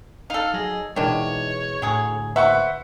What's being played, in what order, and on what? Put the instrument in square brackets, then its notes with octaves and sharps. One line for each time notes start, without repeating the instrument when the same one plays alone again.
[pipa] D#4 A4 [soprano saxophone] F5 [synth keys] D#6 F6
[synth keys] F#3 D#5 [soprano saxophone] G#4
[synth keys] B2 E3 G#3 [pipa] D#3 D4 [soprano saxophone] C#5
[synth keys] A2 D3 [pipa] F#3 G#4
[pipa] F#4 B4 [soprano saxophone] C5 [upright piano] E5 F#5 C#6